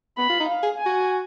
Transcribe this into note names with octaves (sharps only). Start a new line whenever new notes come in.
B3 B5
F4
D#4
F5
G#4
G#5
F#4